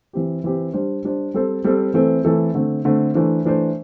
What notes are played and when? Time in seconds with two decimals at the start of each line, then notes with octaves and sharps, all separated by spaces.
0.13 E3 C4 G4
0.44 E3 C4 G4
0.73 G3 D4 C5
1.04 G3 D4 C5
1.34 G3 C4 A4 C5
1.64 G3 C4 A4 C5
1.94 E3 A3 C4 A4
2.25 E3 A3 C4 A4
2.55 D3 A3 C4
2.85 D3 A3 C4
3.14 E3 A3 D4 C5
3.45 E3 A3 D4 C5